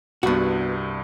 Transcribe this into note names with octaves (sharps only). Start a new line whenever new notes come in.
C2 G2 B3 F#4